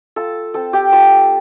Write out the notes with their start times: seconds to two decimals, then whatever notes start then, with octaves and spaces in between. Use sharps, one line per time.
0.16 F4 A4
0.54 C4 A4
0.73 G4
0.92 F4 A5